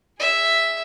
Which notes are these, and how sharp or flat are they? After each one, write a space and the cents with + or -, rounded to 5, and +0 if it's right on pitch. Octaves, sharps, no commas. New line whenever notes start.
G#4 -5 E5 +0